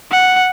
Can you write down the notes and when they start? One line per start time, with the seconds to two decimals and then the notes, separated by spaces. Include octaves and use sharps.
0.11 F#5